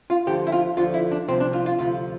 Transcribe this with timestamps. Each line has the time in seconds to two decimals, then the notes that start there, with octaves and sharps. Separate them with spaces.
0.10 F4
0.27 D2 D3 F3 G4
0.47 E4
0.52 F4
0.77 D2 D3 F3 F4
0.94 E4
1.11 D4
1.28 C2 C3 F3 C4
1.40 D4
1.53 F4
1.66 F4
1.78 D2 C3 F3 F4